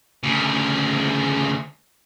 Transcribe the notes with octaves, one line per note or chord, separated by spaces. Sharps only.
D2 C#3